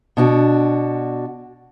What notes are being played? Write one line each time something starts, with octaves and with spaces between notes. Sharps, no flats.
B2 D4 F#4